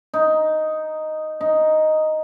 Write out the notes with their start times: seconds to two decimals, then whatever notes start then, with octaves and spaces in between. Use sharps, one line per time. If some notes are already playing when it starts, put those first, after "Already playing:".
0.14 D#4
1.41 D#4